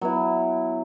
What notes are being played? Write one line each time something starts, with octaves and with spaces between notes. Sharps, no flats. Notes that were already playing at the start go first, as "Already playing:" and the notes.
F#3 B3 E4